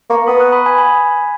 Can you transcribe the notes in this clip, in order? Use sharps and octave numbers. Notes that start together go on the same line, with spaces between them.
A#3 A#5 C#6
B3 B5 D#6
D#6 F#6
B5 D#6
G#5 B5
G#5 B5